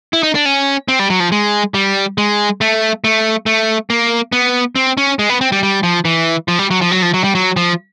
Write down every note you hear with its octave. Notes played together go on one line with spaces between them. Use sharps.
E4
D#4
D4
C#4
C4
G3
F#3
F3
G#3
G3
G#3
A3
A3
A3
A#3
B3
C4
C#4
G#3
B3
C4
G3
G3
F3
E3
F3
G3
F#3
F3
F#3
F3
F#3
G3
F#3
F3